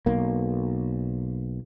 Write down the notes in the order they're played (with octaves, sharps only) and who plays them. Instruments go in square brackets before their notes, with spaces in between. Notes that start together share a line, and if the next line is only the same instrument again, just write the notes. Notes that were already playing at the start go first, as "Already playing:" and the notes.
[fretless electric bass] B1 A#3